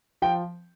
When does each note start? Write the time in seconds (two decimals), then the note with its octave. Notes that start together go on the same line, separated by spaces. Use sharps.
0.22 F3 G5